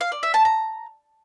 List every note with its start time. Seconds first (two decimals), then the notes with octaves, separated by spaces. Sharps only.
0.01 F5
0.12 D5
0.23 E5
0.34 A5
0.45 A#5